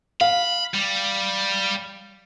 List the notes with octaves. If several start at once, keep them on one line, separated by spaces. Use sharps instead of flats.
F5 B5
G3